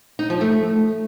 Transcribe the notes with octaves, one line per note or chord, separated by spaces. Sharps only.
D#4
F3
A3